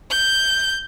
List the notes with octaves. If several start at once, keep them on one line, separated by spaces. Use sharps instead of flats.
G6